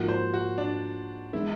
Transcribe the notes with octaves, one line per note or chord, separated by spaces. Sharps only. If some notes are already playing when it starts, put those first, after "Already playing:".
Already playing: G#2 F3 A#3 F#4
C5
F#4
D4
E3 G#3 B3 E4